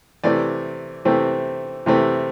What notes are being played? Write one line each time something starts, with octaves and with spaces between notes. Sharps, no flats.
C3 E3 A3 C4 D5
C3 E3 A3 C4
C3 E3 A3 C4